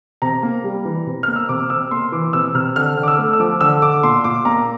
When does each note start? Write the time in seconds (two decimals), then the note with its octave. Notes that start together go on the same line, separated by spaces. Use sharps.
0.22 C3 A#5
0.43 A#3
0.64 G3
0.85 E3
1.07 C3
1.23 A#3 F6
1.36 E6
1.49 C3 D6
1.70 C3 E6
1.91 A#3 C6
2.12 E3 D6
2.33 C3 E6
2.55 C3 F6
2.76 D3 F6
2.97 D3
3.03 D6
3.08 E6
3.18 A3
3.33 E6
3.40 F3 D6
3.61 D3 E6
3.82 D3 D6
4.03 A#2 C6
4.24 A#2 D6
4.45 A#3 A#5